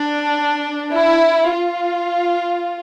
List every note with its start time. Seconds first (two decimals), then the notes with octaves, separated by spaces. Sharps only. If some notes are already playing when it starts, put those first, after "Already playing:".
Already playing: D4
0.94 E4
1.54 F4